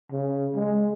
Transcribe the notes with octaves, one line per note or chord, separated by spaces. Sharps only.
C#3
G#3